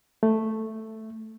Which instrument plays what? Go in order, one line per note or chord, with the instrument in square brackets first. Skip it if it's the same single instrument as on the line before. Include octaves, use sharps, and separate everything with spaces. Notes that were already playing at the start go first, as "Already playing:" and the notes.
[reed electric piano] A3